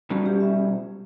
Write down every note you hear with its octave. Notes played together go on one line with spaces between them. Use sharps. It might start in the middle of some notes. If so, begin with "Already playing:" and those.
B2 G3 C#4 F#4
G4
E5